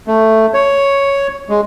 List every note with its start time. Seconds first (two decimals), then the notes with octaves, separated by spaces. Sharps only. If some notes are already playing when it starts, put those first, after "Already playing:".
0.07 A3
0.54 C#5
1.49 G#3